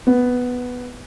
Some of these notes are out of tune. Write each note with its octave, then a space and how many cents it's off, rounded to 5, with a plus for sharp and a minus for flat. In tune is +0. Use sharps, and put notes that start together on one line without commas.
B3 +0